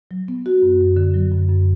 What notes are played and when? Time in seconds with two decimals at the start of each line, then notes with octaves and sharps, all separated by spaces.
0.11 F#3
0.28 B3
0.46 F#4
0.62 F#2
0.80 F#2
0.97 D3
1.14 F#3
1.31 F#2
1.49 F#2